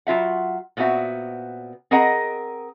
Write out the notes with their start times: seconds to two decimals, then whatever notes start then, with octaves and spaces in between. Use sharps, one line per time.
0.07 F#3 F4 E5 F#5
0.77 A#2 B3 C4 F#4 E5
1.91 C4 G#4 A#4 D#5 F#5 A#5